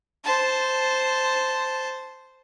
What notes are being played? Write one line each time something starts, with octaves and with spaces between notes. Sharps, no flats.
C5 A5